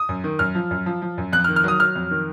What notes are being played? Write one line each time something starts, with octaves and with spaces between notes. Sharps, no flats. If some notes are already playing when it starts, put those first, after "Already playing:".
Already playing: D#6
F#2
D#3
F#2 F6
F3
F#2
F3
F3
F#2
F2 F#6
F6
D#3
F6
F#3 D#6
F#3 F6
F2
D#3